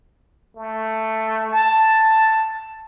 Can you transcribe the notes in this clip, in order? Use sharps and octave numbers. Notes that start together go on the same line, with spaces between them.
A3
A5